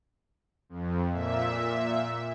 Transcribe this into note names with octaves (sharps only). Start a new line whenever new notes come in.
F2
A#2 E5